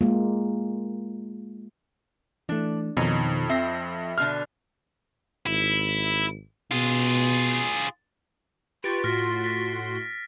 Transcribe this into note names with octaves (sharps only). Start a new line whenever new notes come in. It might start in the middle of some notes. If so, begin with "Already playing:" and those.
G#3 A#3 F4
E3 A3 D4
F2 B2 D#3 D#4 C#5
C4 E5 A#6
B2 D3 D4 F6
G#1 E4
B2 F4 G#4
F4 G4 B4 C#6 A6 D7
A2 F#4 C6 F6 A#6 B6
A#6 B6